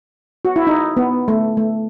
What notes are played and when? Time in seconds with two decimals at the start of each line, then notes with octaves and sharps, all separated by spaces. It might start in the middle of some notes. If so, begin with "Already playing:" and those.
0.45 F#4
0.56 E4
0.67 D#4
0.97 B3
1.28 A3
1.57 A3